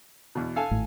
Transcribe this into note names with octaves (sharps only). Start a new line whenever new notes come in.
E2 B2
A4 F5 G#5
G#1 A2